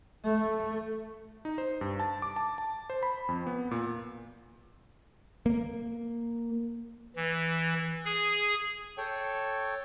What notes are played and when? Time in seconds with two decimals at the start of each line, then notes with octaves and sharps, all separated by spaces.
0.24 A3
1.45 D#4
1.58 C5
1.81 G2
2.00 A5
2.22 D6
2.36 A5
2.58 A5
2.90 C5
3.03 B5
3.29 F2
3.47 B3
3.71 A#2
5.46 A#3
7.16 E3
8.05 G#4
8.98 A4 C#5 G5